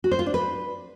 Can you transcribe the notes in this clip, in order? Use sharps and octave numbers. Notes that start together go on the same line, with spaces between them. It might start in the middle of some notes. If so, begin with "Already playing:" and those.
F#4
C5
F4
D4
B4